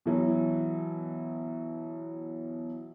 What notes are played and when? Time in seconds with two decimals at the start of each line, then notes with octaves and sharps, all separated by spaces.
0.06 B2 E3 F#3